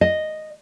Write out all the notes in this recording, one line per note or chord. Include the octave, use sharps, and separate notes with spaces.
D#5